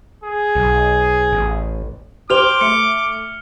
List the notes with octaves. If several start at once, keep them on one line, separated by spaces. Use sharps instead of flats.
G#4
B1
A1
G4 B4 C5 D6 F6 F7 G7
A3 C#7